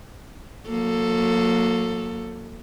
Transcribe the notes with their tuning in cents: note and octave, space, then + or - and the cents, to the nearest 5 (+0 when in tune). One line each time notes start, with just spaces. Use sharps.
F#3 -30 A#3 +0 A4 +10